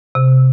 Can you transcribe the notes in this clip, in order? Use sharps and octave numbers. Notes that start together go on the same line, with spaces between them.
C3